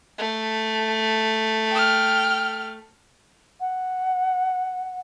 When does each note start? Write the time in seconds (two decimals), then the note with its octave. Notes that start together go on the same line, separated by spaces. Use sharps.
0.18 A3
1.70 G5 F6
3.60 F#5